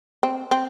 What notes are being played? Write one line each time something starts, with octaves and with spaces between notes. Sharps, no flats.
C4
C4